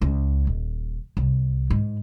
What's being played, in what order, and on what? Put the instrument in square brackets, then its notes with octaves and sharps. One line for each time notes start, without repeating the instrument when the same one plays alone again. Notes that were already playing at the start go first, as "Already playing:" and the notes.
[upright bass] C#2 C#4
D#1
C2
G#2